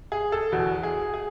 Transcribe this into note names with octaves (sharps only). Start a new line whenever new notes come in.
G#4
A4
E2 B2 F#4
G#4
G#4